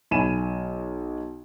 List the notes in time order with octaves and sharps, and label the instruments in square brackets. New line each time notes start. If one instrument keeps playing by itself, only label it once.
[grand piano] B1 G#5 B5 D#7 E7